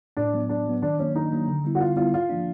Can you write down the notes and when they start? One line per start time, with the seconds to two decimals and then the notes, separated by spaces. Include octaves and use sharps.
0.17 A2 D4
0.34 F#3 B3
0.49 A2 D4
0.66 F#3 B3
0.82 D#3 D4
0.99 F#3 A#3 C#4 D4
1.15 D#3 D#4
1.32 F#3 A#3 D4
1.48 D3
1.64 G3 B3 E4
1.75 F#4
1.80 D3 F4
1.97 G3 B3 E4 F4
2.13 G#2 F4
2.30 F3 A#3 D4